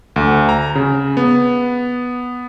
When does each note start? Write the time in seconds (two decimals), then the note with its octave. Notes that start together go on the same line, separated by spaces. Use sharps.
0.16 D2
0.49 A#5
0.75 C#3
1.17 B3